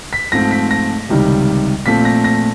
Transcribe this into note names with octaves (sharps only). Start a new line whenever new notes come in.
B6
G#2 F3 A3 C4 A#6
B6
A#6
C#2 C3 D#3 G3
A#2 F3 A3 C4 B6
A#6
A#6